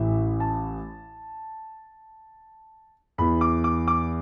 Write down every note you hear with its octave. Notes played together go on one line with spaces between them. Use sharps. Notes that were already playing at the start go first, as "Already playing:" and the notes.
Already playing: A1 A2 E3 E5
A5
E2 E3 B5
D6
D6
D6